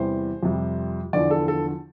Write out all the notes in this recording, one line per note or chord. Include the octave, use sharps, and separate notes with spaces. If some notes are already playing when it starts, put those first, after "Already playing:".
Already playing: E2 C3 E3 G3 C5
F2 C3 G3
E2 D3 F3 D5
A4
A4